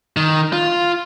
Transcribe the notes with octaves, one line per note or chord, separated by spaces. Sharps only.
D#3
F4